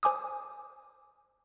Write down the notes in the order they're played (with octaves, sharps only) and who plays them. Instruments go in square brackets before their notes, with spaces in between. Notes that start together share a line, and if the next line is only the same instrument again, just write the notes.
[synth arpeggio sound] C5 G#5 D6 D#6